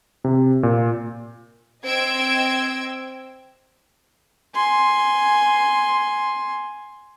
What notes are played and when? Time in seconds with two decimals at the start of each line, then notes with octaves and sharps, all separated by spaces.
0.24 C3
0.63 A#2
1.83 C4 D#5 G5 E6 G#6 D7
4.55 G#5 C6